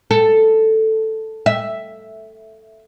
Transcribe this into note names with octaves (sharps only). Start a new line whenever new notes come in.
A4
E5